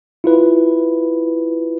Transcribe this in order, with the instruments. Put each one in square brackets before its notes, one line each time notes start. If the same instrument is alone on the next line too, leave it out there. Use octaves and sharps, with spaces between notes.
[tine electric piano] E4 F4 B4